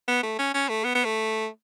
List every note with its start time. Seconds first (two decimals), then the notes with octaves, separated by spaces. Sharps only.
0.08 B3
0.23 A3
0.39 C#4
0.54 C#4
0.69 A3
0.84 B3
0.95 B3
1.05 A3